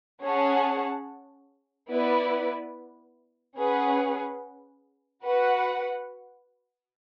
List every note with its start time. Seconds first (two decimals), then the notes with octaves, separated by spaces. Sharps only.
0.22 C#4 G#4 C#5 F#5 A5
1.90 B3 E4 B4 D5
3.57 C#4 G#4 B4 F#5
5.25 F#4 B4 F#5